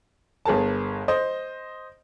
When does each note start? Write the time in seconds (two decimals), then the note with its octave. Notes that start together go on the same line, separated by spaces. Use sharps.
0.45 G1 G#4 A#4 A5
1.08 C5 D#5